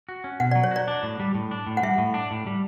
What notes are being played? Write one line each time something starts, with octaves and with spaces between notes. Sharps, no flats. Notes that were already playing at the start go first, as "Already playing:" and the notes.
F#4
C#4
B2 F#5
F#3 D5
C#5
F#4 D5
D4
A2
G3
A2
D4
A2
F#5
G3 E5
A2
D4
A2
G3